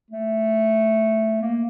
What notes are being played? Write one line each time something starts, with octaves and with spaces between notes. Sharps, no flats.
A3
A#3